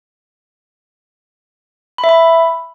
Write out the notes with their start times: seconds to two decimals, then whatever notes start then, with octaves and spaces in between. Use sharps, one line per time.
1.98 B5
2.04 E5
2.09 B5